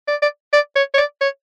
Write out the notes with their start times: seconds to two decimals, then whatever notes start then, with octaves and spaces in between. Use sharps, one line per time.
0.08 D5
0.22 D5
0.53 D5
0.76 C#5
0.94 C#5
0.98 D5
1.21 C#5